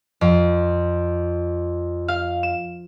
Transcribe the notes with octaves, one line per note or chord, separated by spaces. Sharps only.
F2
F5
E7